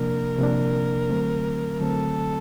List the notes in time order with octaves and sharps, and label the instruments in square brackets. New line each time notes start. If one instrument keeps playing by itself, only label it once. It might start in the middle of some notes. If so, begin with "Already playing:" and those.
Already playing: [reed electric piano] C3 F3 A#3 D4 [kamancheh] A#4
[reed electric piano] C3 F3 A#3 D4
D3 F#3 A3 C4
[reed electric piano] D3 F#3 A3 C4 [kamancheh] A4